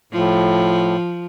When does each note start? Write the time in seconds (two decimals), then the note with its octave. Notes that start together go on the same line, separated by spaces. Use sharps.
0.13 A2 F3